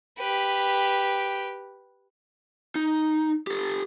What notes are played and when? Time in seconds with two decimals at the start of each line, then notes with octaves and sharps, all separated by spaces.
0.19 G4 B4
2.75 D#4
3.47 G4 A4